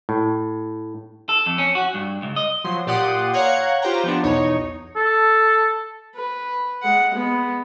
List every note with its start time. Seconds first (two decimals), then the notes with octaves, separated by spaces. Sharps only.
0.09 A2
1.29 A4
1.46 F2
1.58 C#4
1.75 F#4
1.94 G2
2.22 C#2
2.36 D#5
2.64 F3 F#3 C6
2.86 A#2 G4 D5 F#5 C6 D#6
3.33 C#5 F5 F#5 A#5 F#6 G#6
3.82 F4 G4 C5 G5 A#5
4.03 F3 B3 D4
4.23 B1 E2 D#4 C#5
4.96 A4
6.15 B4
6.83 G#3 F#5
7.13 G#3 B3